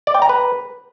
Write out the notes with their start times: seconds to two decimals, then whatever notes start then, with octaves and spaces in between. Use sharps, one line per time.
0.07 D5
0.15 G5
0.22 A#5
0.29 B4